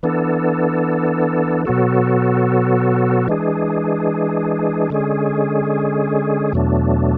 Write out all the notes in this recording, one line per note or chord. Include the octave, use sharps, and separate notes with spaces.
E3 B3 D4 A4
B2 F#3 B3 F#4 A4
E3 G#3 D4 G#4
D3 G#3 C#4 G#4
E2 B2 F#3 A3 D4